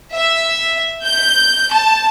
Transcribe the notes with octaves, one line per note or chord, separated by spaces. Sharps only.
E5
G6
A5